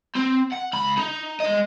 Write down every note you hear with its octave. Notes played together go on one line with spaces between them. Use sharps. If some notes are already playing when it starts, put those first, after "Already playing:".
C4
F#5
C#2 B5
D#4
G#3 D#5